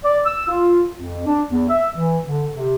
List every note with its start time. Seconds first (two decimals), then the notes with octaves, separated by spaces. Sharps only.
0.05 D5
0.26 E6
0.48 F4
0.95 F2
1.26 D4
1.49 E2
1.69 E5
1.96 E3
2.26 D3
2.54 C3